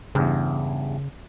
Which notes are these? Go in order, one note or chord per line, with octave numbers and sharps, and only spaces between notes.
E2 G2 C#3